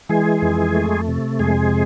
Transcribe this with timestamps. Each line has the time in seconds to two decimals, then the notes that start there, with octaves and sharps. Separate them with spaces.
0.09 E3 G#3 G#4
0.42 F2
0.75 A3
1.08 C3
1.39 F2 G#3 G#4